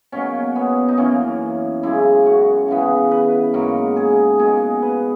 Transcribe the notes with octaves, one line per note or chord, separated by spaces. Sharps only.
B2 F#3 A#3 C#4
B3
D#4
F#2 E3 A#3 C#4
F#2 C#3 G#3 E4
F#4
C#3 E3 B3
B4
G#2 F#3 A#3 A#4
G#4
B2 A#3 G#4
B4